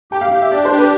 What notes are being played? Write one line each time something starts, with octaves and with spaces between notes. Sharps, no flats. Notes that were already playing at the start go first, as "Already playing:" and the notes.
G4 G5
F5
G4 F5
E5
D4 D5
C5
G4
B4